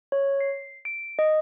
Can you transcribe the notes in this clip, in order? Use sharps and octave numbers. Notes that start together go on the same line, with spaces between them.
C#5
C7
D7
D#5